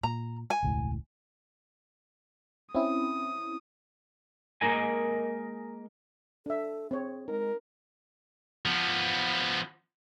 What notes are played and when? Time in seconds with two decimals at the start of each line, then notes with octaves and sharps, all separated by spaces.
0.03 A#2 A#5
0.50 G#5
0.63 E1 C#2 A2
2.74 C4 C#4 E4 D#6
4.61 G#3 A#3 D#4 A#4 D#5 G#5
6.46 D4 A4 E5
6.91 C4 G#4 C#5
7.28 G#3 D#4 A#4
8.65 F3 B3